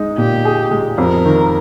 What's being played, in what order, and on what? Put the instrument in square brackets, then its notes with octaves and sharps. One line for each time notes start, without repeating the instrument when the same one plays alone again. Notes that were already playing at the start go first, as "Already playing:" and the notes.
Already playing: [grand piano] G#3 D#4
[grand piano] A#2 [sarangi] G4
[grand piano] G#4
G#3
[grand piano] F2 [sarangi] A#4
[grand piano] D#3